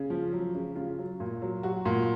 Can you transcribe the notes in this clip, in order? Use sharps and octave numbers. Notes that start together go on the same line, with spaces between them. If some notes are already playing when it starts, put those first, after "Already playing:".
Already playing: C#3
F3
F#3
C#3
C#3 F4
F#3
A#2
F#3
F#3 F#4
A#2